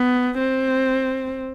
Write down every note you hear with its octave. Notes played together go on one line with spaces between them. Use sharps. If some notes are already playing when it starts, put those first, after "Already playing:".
Already playing: B3
C4